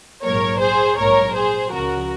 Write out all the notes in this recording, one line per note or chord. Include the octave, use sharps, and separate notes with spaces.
A#1 G#2 F#3 A#3 A#4 C#5
G#4 C5
A#1 G#2 F#3 A#3 A#4 C#5
G#4 C5
C#2 C#3 F3 F#4 A#4